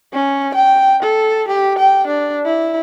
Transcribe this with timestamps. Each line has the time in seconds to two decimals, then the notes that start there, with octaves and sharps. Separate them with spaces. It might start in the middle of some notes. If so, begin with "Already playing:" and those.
0.13 C#4
0.55 G5
1.03 A4
1.48 G4
1.79 G5
2.07 D4
2.46 E4